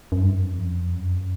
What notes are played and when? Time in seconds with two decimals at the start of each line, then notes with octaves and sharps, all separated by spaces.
0.12 F#2
0.23 G2
0.34 F#2
0.53 F2
0.95 F#2